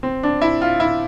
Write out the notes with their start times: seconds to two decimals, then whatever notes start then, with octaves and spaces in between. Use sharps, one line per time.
0.03 C4
0.23 D4
0.41 E4
0.61 F4
0.80 E4